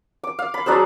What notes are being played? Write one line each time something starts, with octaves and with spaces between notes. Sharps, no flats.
D6
F5
B5
F#3 D4 G#4 C5